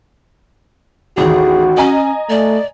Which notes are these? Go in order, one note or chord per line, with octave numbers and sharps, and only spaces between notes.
A1 D#2 F#4 G#4
C#4 D#5 G#5 A#5
A3 D5